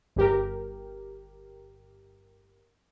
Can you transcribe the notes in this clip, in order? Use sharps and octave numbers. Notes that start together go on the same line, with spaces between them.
G1 G4 A#4